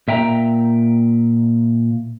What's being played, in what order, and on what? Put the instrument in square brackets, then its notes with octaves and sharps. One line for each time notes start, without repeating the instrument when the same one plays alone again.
[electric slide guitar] A#2 E5 G5 A#5